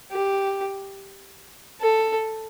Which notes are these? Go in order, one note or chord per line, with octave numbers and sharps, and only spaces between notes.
G4
A4